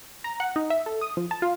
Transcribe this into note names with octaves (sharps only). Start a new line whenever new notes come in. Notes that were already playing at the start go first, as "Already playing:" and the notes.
A#5
F#5
D#4
E5
A4
D#6
F3
A5
F4